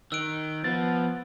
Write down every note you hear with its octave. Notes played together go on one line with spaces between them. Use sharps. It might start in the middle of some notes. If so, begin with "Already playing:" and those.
D#3 E6 F#6 D7
F3 B3 A6